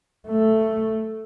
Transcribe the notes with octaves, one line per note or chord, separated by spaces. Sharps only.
A3